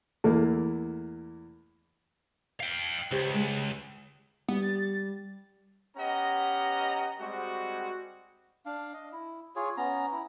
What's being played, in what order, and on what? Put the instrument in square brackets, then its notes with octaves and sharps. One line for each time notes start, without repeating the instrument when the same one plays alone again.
[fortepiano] E2 A3 A#3 E4 A4
[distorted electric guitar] F5 G5
[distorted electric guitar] C#2 [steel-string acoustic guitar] G4 C5
[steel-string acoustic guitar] G#3
[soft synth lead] G3 [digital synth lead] B3
[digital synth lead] A6
[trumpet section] B3 C#4 G4 D#5 F#5 A#5
G3 G#3 C4 F#4
[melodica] D4 F5
D#5
E4
F4 G#4 C#5
B3 C#4 A#5
E4